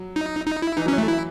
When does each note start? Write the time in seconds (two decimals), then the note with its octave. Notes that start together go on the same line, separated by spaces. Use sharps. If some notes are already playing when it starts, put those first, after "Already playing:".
Already playing: F#3
0.16 D#4
0.47 D#4
0.62 E4
0.77 E3 D#4
0.86 F#3 C#4
0.93 E3 A3
1.08 E4